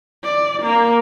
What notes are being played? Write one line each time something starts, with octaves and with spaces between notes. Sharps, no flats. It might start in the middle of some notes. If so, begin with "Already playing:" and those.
D5
A#3